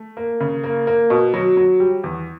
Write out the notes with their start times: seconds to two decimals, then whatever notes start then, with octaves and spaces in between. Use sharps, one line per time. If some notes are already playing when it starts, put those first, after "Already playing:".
Already playing: A3
0.17 A#3
0.40 C#3
0.64 A#3
0.87 A#3
1.10 B2
1.34 F#3
1.57 F#3
1.80 G3
2.04 E2